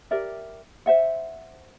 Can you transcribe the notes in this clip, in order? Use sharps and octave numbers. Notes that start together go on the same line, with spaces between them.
G4 A#4 D5 E5
C5 E5 F#5